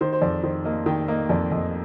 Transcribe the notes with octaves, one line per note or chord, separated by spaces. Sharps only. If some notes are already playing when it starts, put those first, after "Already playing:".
D#3 C5
C5
F2 D5
D#3 C5
A#3 D#5
D#3 G5
A#3 D#5
F2 D5
F2 D#5